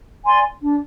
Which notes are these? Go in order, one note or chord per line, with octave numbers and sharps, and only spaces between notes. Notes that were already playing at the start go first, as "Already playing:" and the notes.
D5 G#5 C6
D4